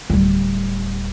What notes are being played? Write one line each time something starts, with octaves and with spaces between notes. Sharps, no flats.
D1 G3